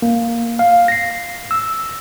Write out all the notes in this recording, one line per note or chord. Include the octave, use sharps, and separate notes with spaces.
A#3
F5
A#6 C7
E6